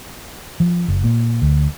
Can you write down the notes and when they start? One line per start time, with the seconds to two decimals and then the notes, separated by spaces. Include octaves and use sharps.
0.60 F3
0.88 F#1
1.04 A#2
1.42 D2